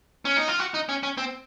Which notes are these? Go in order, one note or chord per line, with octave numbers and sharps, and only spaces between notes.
C#4
D#4
F4
F#4
D#4
C#4
C#4
C4